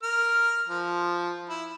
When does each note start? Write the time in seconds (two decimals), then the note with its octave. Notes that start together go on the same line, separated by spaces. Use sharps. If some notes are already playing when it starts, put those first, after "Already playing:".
0.03 A#4 F6
0.68 F3
1.49 E4